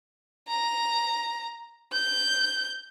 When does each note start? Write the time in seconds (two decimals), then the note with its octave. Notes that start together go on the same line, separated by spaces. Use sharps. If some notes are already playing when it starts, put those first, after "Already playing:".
0.48 A#5
1.93 G6